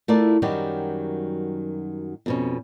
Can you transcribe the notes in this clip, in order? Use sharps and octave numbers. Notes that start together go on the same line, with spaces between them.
A3 E4 F4 A#4 D5
F#2 D#3 F#3 G3 F#4 G4
F2 B2 C#4